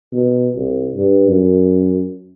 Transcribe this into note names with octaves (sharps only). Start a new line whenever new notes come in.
B2
C2
G2
F#2